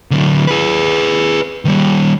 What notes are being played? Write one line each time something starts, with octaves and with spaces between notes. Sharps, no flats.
D3 F#3
G#4 B4
D#3 G3